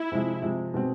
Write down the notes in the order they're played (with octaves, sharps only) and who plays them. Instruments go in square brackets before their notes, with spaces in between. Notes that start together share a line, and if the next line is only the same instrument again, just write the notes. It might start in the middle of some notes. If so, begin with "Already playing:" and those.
Already playing: [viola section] E4
[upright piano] C3 F3 G#3
C3 F3 G#3
B2 G#3 C4